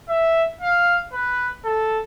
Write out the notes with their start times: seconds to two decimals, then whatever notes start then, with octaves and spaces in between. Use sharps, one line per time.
0.09 E5
0.61 F5
1.13 B4
1.65 A4